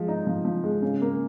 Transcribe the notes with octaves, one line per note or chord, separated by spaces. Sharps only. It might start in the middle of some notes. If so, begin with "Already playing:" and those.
Already playing: F3 G#3
D#4
F3
F3
G#3
C#3
A#3